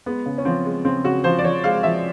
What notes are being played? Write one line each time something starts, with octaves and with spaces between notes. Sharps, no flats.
G#3 B3
C#3
C#4
F3 C4
G#3
C#3 C4
C#3 F#4
F3 C5
D5
F3 C#5
G#3 F5
F3 E5